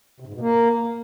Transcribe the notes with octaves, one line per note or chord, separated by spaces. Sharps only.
C3
G#2
B2
A#3